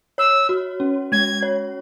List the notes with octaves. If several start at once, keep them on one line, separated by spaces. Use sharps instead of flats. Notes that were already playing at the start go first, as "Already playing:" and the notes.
C#5 E6
F#4
C#4
G#3 G#6
C#5